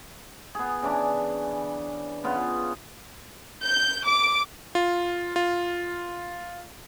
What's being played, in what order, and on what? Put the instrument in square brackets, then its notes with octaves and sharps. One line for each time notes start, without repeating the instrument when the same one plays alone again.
[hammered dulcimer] B3 G#4
C#3 E3 D4
C#3 B3 F4
[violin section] G6
D6
[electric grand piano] F4
F4